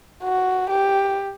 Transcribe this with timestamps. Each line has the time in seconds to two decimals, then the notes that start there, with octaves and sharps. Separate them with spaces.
0.24 F#4
0.70 G4